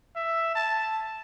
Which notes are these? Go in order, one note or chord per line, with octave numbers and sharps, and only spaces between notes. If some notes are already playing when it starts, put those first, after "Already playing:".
E5
A5